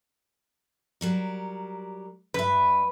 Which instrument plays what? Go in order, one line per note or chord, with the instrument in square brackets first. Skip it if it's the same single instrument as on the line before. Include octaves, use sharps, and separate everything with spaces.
[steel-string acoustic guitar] F#3 G3 A#4
[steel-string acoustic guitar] G2 E5 [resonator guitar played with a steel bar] B4